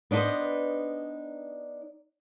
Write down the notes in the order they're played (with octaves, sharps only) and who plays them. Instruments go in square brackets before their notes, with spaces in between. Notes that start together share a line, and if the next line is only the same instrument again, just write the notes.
[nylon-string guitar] B3 D4 D#4 B4 C5